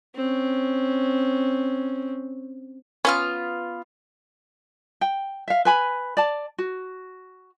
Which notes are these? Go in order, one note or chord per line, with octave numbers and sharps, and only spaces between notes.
C4 C#4
B3 C#4 F4 F6
G5
E5 F5
B4 G#5 B5
D5 A5
F#4